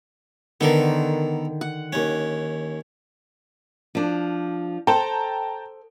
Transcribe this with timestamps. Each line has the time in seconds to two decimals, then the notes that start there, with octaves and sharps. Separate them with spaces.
0.61 D3 D#3 B3 A4 A#4
1.61 F#5
1.93 D#2 C#4
3.95 F3 D4
4.87 A4 C5 G5 A5 A#5